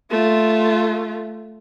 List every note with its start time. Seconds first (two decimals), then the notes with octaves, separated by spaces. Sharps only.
0.11 A3 F4